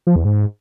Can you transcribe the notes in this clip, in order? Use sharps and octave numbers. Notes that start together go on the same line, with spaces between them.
F3
E2
G#2